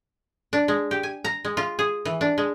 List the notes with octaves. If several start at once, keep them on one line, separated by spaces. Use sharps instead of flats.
D4
G#3
G4
G#5
A#5
G#3
F4
G#4
E3
D4
G#3